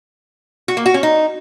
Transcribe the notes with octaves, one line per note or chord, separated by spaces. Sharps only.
F#4
A#3
F#4
C#4
D#4